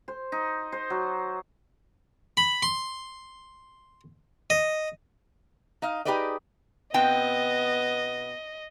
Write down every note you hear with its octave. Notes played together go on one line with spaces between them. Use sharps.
C5
D#4
C5
F#3
B5
C6
D#5
D#4 D#5 F5
D#4 G4 G#4 B4 D5 D#5
B2 B3 C4 D#5 G5